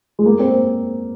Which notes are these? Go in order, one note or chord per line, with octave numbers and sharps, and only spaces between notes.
G#3
A#3
C4